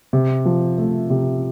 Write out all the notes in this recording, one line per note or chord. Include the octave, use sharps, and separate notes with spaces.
C3
F3
A3
C3